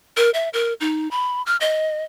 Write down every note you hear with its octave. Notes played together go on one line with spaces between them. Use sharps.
A#4
E5
A#4
D#4
B5
F6
D#5